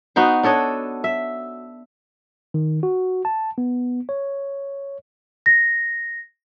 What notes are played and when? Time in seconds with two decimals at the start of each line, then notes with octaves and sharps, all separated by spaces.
0.16 B3 D#4 F#4 C5
0.43 D4 A4 C#5 D#5
1.04 E5
2.54 D#3
2.83 F#4
3.25 A5
3.58 B3
4.09 C#5
5.46 A#6